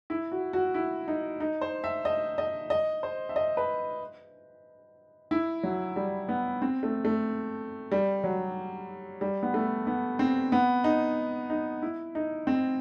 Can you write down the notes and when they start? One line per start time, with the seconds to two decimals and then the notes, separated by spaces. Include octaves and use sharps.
0.10 E4
0.32 F#4
0.53 F#4
0.74 E4
1.08 D#4
1.40 D#4
1.61 C5
1.84 E5
2.05 D#5
2.38 D#5
2.70 D#5
3.03 C5
3.29 E5
3.36 D#5
3.57 B4
5.31 E4
5.63 F#3
5.96 G3
6.29 B3
6.62 C4
6.83 A3
7.05 A3
7.92 G3
8.24 F#3
9.21 G3
9.43 B3
9.54 A3
9.87 B3
10.19 C4
10.52 B3
10.84 D#4
11.50 D#4
11.82 E4
12.15 D#4
12.47 C4